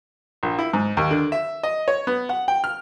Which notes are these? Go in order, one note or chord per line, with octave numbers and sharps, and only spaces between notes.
A#1
E4
G#2
D#2
D3
E5
D#5
C#5
B3
F#5
G5
F6